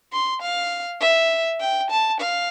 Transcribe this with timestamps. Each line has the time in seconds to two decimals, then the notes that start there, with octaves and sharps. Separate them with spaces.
0.13 C6
0.42 F5
1.01 E5
1.60 G5
1.90 A5
2.20 F5